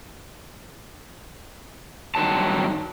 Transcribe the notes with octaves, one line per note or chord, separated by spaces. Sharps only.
G2 D#3 F#3 A5